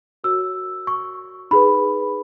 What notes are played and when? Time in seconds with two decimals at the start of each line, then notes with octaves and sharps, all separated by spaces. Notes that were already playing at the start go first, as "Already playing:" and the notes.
0.24 F#4 A#4 C#5 E6
0.87 C#6
1.51 D#4 G#4 B4 B5